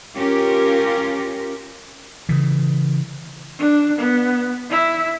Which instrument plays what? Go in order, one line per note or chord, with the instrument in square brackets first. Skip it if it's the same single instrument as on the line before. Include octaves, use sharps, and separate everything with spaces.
[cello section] C#4 F4 G4 A#4
[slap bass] C#3 E3
[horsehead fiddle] D4
B3
E4